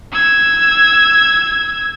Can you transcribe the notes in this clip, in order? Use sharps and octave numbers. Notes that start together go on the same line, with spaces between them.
E6 G#6